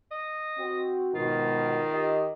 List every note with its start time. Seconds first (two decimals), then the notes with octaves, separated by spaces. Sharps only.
0.11 D#5
0.59 C4 F#4
1.15 G#2 B2 D#3 F4
1.93 G4 D#5